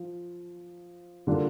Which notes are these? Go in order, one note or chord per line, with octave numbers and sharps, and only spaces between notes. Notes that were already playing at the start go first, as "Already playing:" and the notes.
Already playing: F3
D3 G3 A#3 D4 F4